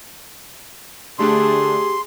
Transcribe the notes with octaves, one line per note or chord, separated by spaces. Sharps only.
D3 A3 D4 G4 G#4 C6